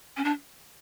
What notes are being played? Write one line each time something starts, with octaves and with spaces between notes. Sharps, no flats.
C#4
D4